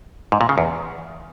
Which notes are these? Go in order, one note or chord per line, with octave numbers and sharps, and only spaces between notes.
G#2
A#2
C#3
E2